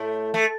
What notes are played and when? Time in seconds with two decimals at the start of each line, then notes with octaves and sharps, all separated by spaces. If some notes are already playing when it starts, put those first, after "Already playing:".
Already playing: A2 A3
0.34 A3